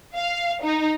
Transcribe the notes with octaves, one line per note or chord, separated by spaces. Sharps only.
F5
D#4